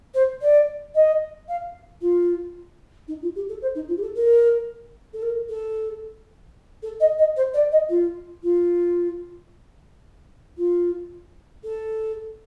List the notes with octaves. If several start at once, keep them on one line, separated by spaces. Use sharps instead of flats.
C5
D5
D#5
F5
F4
D#4
F4
G4
A4
C5
D#4
F4
G4
A4
A#4
A4
A#4
A4
A4
D#5
D#5
C5
D5
D#5
F4
F4
F4
A4